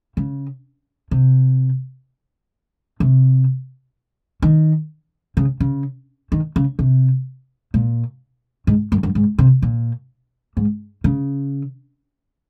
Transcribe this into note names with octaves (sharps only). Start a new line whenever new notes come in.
C#3
C3
C3
D#3
C#3
C#3
D#3
C#3
C3
A#2
G#2
F#2
F#2
G#2
C3
A#2
G#2
C#3